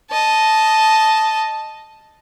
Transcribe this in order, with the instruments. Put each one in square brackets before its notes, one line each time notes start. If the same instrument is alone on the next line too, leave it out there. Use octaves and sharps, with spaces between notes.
[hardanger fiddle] D#5 A5